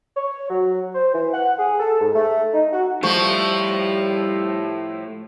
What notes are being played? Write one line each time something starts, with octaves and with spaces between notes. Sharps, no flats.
C#5
F#3
C5
E3
F#5
G#4
A4
G#2
A3
D#4
F#4
A2 F3 G3 A3 C#6